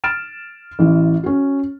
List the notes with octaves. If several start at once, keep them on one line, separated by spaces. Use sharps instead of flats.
F6 A6 D7 E7
A1 E3
C#4 F#4